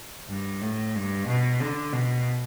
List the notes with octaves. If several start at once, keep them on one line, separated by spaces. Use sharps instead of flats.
G2
A2
G2
B2
D3
B2